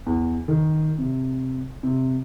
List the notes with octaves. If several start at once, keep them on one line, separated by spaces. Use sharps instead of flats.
E2
D#3
C3
C3